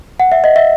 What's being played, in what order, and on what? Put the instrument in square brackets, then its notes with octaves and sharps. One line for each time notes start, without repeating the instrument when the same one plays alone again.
[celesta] F#5
E5
D#5
E5